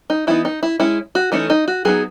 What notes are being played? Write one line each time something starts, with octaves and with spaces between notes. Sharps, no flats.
D#4
E3 B3 D#4 E4
D#4
E4
G#3 C#4 E4
F#4
E3 A3 C#4 D#4
D#4
F#4
F#3 B3 D#4 G#4